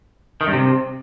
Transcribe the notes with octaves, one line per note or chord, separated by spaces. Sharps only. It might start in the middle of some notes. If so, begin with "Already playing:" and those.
D#3
G2
C3